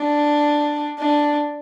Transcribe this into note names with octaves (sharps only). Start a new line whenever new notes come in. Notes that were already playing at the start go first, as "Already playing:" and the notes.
Already playing: D4
D4